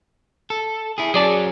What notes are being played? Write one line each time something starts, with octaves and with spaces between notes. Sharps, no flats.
A4
E4 G#4
F#3 C#4 G#4 D5 A5